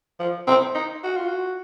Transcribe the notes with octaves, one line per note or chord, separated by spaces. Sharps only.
F3
C4
D#4
F#4
F4
F#4